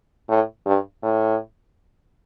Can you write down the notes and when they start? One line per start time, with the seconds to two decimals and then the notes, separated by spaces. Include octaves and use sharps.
0.29 A2
0.66 G2
1.03 A2